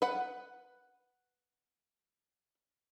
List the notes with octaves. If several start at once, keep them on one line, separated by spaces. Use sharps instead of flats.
B4 F#5